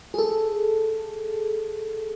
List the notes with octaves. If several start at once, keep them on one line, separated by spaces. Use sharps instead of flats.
G#4 A4